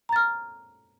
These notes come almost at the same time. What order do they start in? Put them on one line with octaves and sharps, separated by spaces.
A#5 A6 F6